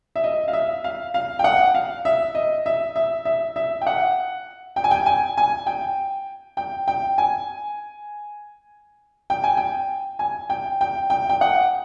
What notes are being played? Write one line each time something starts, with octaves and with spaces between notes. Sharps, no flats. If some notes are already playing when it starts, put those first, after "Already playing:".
E5
D#5
F5
E5
F5
F5
G5
F#5
F5
E5
D#5
E5
E5
E5
E5
G5
F#5
G5
G#5
G5
G#5
G#5
G5
G5
G5
G#5
G5
G#5
G5
G#5
G5
G5
G5
G5
F#5